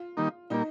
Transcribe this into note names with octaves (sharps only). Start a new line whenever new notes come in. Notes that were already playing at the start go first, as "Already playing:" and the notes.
Already playing: F4
D#3 G3 A#3 D#4
A#2 G3 A#3 D#4